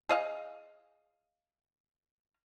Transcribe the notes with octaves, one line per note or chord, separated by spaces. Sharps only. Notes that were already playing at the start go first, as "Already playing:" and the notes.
G#4 D#5 F5